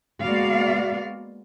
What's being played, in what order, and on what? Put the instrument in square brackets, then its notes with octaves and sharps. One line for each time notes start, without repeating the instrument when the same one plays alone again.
[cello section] G#3 A#3 B3 F#4 D5 F5